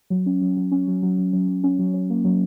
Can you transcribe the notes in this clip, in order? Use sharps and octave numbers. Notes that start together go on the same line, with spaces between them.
F#3
C#4
F#3
F#3
C#4
F#3
F#3
F#3
F#3
F#3
C#4
F#3
C#4
A#3
F#3